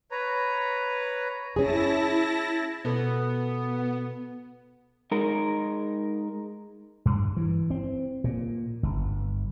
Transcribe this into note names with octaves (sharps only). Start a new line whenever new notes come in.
B4 C#5 A#5
C#4 E4 G#4 A5 A#6
B2 B3 A4 B4
G#3 D#4 A#4
G2
E3
C4
A#2
G1